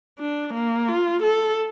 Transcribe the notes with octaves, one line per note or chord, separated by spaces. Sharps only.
D4
A#3
F4
A4